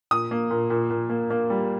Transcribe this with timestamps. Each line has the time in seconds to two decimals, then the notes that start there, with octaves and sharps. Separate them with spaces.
0.11 A#2 D#6
0.31 A#3
0.50 A#2
0.70 A#2
0.90 A#2
1.10 A#3
1.30 A#3
1.50 G3